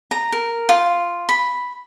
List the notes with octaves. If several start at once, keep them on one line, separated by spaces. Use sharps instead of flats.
A#5
A#4
F4
B5